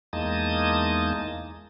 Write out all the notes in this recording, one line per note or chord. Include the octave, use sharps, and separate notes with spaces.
E2 G#3 A#3 D#4 A5 D#6